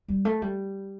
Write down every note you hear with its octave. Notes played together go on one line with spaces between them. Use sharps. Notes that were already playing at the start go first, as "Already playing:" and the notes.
G3
A3
G3